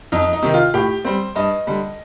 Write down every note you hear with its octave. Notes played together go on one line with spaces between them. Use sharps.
F2 D#4
D#4
C3 D#3
F4
A2 G4
G3 C4 C5
G2 D#5
D3 G3